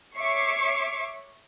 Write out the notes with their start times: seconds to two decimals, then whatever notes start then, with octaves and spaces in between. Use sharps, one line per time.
0.16 C#5 E5 C#6 D6 C7 C#7